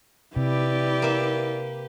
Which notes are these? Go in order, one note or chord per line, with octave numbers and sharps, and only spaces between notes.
C3 E4 G4 B4 D5
A#3 E5